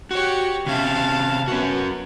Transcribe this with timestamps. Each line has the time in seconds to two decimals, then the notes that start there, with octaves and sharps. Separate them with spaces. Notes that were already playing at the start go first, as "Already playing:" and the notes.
0.11 F#4 G4 C#5
0.66 C3 C#4 E5 F5 A5
1.48 B3 C#4 F#4